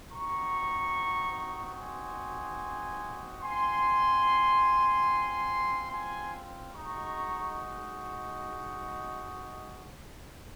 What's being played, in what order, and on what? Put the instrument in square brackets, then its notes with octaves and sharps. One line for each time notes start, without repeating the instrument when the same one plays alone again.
[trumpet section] C4 D#4 F#4 A#5 C#6
G#5 C6
C4 F4 G#5 C6
G#5 C6
G#3 D#4 F#4 A#5 C#6